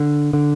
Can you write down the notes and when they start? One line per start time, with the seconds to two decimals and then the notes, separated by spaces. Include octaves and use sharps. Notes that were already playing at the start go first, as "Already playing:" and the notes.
Already playing: D3
0.33 D3